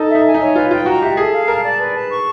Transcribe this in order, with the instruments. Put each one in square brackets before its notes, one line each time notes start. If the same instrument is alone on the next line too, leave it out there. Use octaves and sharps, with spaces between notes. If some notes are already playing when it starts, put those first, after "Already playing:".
Already playing: [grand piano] D#4 [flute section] A4
[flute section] E5
[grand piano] D#4
[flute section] G#5
[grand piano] D#4
[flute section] C#5
[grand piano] F4 [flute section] B4
[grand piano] F4 [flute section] G5
[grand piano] F#4 [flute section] A#5
[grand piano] G4 [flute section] E5
[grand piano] G#4 [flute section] A4
[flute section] F5
[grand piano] A#4 [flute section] A5
[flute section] D5
B4
A5
C#6